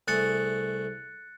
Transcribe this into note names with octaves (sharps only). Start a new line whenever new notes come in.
C2 A3 G#4 F#6 A6 C#7